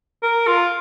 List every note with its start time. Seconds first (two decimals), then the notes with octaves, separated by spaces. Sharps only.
0.22 A#4
0.47 F4